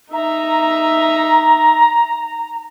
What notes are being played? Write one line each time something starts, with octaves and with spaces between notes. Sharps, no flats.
D#4 E5 A#5